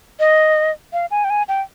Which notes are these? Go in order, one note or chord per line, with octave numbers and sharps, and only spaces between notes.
D#5
F5
G#5
G5
G#5
G5